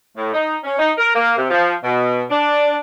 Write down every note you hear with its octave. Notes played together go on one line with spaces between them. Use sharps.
A2
D#4
C#4
D#4
A#4
A#3
C3
F3
B2
D4